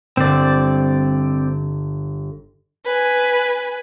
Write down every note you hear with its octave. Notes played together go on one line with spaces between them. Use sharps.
G1 C4 D5
B4 G#5